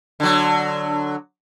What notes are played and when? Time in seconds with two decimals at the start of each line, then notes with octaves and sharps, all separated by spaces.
0.20 D3 F#3